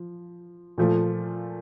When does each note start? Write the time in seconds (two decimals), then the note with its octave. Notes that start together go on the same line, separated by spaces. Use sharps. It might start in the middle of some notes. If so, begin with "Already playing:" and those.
Already playing: F3
0.78 A#2 F3 A3